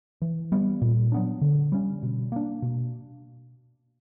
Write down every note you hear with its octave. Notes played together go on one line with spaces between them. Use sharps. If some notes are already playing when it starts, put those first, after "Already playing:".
E3
G3 B3
A#2
F#3 B3 D4
D3
G3 C#4
B2
A#3 D4
B2